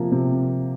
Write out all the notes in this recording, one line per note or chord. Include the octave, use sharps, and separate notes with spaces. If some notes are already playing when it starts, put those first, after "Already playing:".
Already playing: C3 F3 A#3
C3